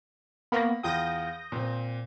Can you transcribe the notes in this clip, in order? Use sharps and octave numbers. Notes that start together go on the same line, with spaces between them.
A#3 B3 B5 C#6 A#6
E2 F4 G5 D#6 G6 A#6
A#2 C4